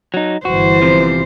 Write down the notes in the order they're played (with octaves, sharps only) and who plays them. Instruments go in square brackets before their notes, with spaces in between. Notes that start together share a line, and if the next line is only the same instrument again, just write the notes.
[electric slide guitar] F#3 D#4
[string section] G1 E3 [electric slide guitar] F#4 [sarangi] C5
[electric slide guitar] C3 F3